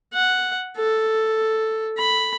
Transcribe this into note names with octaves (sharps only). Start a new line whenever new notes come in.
F#5
A4
B5